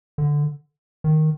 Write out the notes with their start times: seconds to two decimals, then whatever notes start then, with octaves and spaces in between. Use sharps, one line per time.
0.18 D3
1.04 D#3